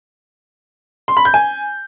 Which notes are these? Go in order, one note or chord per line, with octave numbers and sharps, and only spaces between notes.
C6
B5
G6
G#5